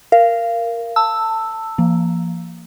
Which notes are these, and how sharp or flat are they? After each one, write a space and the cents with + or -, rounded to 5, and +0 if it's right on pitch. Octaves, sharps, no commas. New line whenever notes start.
A#4 +0 F5 -20
A5 +20 E6 +0
F3 -30 A#3 -5